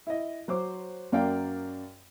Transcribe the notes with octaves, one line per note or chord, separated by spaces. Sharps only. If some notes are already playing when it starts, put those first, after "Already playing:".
E4 D#5
F#3 C5 D6
F#2 A#3 D5 F5 G5